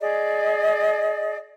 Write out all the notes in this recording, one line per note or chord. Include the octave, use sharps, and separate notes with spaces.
G#4 D5 D#5